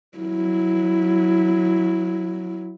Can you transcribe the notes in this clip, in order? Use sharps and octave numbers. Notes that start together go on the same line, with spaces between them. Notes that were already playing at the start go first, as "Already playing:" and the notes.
F#3 E4